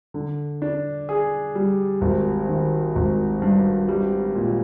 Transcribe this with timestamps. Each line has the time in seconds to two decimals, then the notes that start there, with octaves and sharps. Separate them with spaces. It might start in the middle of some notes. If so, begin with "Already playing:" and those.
0.14 D3
0.62 D4
1.09 G#4
1.55 G3
2.01 G#1
2.49 D#3
2.96 G#1
3.42 G2
3.88 G3
4.35 A#2